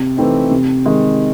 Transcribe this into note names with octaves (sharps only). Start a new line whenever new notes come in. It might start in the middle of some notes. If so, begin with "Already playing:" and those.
Already playing: C3
E3 A3 C4 D#4
C3
D#3 G#3